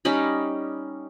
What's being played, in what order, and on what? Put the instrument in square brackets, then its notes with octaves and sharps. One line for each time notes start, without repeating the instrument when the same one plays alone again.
[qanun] G3 C#4 D#4 B5